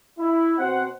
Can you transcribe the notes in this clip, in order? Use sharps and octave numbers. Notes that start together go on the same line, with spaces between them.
E4
B2 C4 F#4 C5 F#5